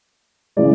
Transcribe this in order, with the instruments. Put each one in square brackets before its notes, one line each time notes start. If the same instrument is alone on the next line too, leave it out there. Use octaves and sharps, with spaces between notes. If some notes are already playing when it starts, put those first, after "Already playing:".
[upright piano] C#3 E3 G#3 D5